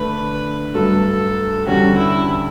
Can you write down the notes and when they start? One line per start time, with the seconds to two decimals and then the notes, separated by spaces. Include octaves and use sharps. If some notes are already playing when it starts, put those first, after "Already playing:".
Already playing: D3 A3 D4 B4
0.74 G2 F#3 A3 A4
1.66 E2 D3 G3 C#4 F#4 G4
1.98 E4